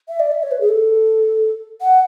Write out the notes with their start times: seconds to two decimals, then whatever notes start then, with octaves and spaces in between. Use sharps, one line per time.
0.09 E5
0.20 D5
0.31 E5
0.43 C#5
0.51 B4
0.61 G#4
0.69 A4
1.82 F#5